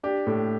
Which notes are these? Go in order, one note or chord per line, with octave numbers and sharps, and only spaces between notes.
D4 G4
A2